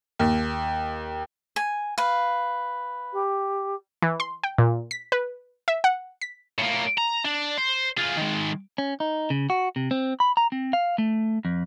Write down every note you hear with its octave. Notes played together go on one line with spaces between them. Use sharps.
D#2
G#5
B4 F5
G4
E3
C6
G5
A#2
B6
B4
E5
F#5
B6
A2 A#3
A#5
D4
C5
F4 G#4
D#3 G#3
C#4
D#4
C#3
F#4
C3
C4
B5
A#5
C4
F5
A3
F2